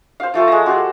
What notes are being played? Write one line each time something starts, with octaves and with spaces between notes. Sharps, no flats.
C5 F5
F3 A3 A4 A5
G#3 A#5
F#4 G4 A4